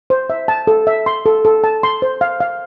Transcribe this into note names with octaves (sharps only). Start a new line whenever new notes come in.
C5
E5
A5
A4
E5
C6
A4
A4
A5
C6
C5
F5
F5